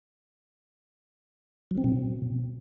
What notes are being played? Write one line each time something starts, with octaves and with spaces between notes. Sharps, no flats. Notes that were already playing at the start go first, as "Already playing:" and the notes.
F#3
C4
B2